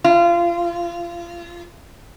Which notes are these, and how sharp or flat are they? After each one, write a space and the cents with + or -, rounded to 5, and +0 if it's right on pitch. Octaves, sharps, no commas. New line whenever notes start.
F4 -25